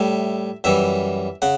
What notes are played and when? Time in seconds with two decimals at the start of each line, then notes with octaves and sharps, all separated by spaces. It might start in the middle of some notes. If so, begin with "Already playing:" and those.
Already playing: A2 G3 E5
0.64 F#2 E3 G3 E5
1.42 C#3 F#5